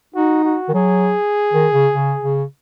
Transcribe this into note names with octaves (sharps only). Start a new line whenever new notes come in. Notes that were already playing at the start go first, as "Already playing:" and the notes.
D#4 F#4
F#4
D#3
F#3 G#4
D#3
C#3
C#3
C#3